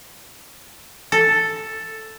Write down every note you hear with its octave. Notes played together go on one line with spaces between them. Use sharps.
A4